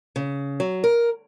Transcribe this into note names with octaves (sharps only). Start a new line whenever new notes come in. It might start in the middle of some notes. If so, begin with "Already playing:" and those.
C#3
F#3
A#4